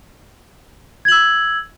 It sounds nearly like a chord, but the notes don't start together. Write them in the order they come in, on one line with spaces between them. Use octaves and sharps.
G#6 F#7 E6